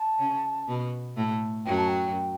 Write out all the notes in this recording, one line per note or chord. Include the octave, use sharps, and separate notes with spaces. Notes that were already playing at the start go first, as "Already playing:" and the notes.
Already playing: A5
C#3 C#4
B2 B3
A2 A3
F#2 F#3 G5
A5
G5